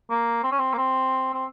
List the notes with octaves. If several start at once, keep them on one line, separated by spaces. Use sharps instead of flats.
A#3
C4
C#4
C4
A#3
C4
C4